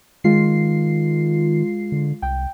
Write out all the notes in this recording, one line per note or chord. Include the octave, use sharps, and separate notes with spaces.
D#3 G#3 F4 C7
D3
C2 G5